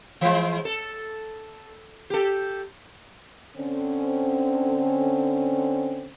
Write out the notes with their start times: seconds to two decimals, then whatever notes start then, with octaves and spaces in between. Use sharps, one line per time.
0.21 E3 G#3
0.65 A4
2.10 G4 A4
3.57 D3 C4 C#4